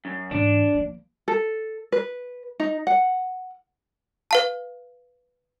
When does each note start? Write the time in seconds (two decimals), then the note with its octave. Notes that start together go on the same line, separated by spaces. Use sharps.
0.05 F#2
0.31 G#2 E3 D4
0.75 F3 A#3
1.28 A4
1.92 B4
2.60 D#4
2.87 F#5
4.31 B4 F5 A5